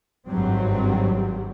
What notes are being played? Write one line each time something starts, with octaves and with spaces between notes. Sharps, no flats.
G#1 G2 F#3 G3 C4